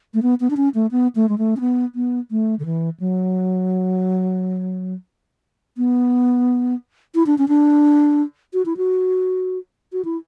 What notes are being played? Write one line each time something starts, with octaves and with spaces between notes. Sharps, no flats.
A3
B3
B3
D4
C#4
A3
B3
A3
G#3
A3
C#4
B3
B3
A3
D3
E3
F#3
B3
E4
D4
C#4
D4
F#4
E4
F#4
F#4
E4